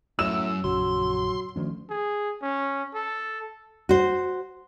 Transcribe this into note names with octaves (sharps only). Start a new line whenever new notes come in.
F#2 A2 E6 E7
A#1 F#2 C#3 F#3 C6
D2 D#3 F3 C#4
G#4
C#4
A4
F#4 C5